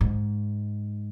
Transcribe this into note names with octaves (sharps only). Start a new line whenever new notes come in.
G#2